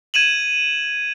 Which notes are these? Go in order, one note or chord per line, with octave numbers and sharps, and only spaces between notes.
G#6 D#7 E7 F#7